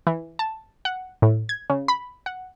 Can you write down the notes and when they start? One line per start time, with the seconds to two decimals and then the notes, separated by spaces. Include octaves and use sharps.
0.07 E3
0.39 A5
0.85 F#5
1.22 A2
1.49 G#6
1.70 C#3
1.88 B5
2.26 F#5